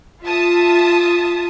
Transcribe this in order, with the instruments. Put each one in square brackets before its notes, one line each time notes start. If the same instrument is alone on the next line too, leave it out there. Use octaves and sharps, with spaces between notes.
[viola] F4 [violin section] E5 A5 D#6